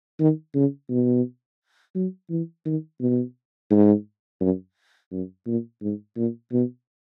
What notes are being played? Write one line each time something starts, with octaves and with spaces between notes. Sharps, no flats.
D#3
C#3
B2
F#3
E3
D#3
B2
G#2
F#2
F#2
A#2
G#2
A#2
B2